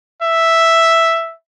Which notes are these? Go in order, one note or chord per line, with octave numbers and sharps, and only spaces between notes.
E5